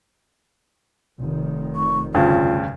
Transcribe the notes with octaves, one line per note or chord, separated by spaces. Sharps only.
F1 D#3
C#6
D2 G2 C#3 F4